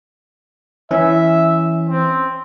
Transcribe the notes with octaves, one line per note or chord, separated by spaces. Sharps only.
E3 C#4 E5
C4